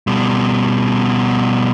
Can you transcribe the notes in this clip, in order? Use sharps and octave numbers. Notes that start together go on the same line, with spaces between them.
B2 G3